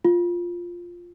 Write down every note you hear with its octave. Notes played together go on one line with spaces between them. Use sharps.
F4